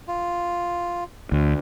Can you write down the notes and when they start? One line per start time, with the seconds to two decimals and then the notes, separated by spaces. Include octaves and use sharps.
0.08 F4
1.32 D2